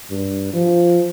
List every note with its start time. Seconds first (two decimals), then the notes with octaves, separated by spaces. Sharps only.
0.10 G2
0.53 F3